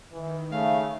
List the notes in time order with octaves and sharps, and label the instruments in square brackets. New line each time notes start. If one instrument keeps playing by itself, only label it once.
[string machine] D#3 [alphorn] E3
[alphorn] C#3 [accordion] A3 [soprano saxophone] F5